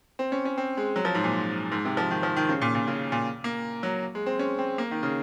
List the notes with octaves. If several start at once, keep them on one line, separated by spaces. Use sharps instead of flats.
C4
C#4
C#4
C4
G#3
F#3
F3
G#2
A#2
G#2
C3
F3
D#3
F3
D#3
C#3
A#2
A#2
C#3
A#2
A#3
F#3
G#3
C4
C#4
C4
A#3
D#3
C#3